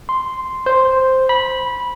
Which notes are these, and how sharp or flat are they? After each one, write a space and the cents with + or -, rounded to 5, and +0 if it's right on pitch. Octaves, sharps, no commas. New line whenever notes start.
C6 -5
C5 +0
B5 -15